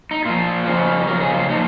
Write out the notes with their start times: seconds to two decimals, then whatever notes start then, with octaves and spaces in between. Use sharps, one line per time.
0.11 D#4
0.25 A#2 F3 F4
0.66 F2 C#3 F3
1.07 F2 C#3 A#4
1.21 G#4
1.34 F4
1.48 A#2 F3 D#4